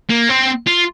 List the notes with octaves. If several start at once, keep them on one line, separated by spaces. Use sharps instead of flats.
A#3
C4
F4